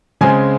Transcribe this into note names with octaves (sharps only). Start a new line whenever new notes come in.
C#3 G#3 C4 G#5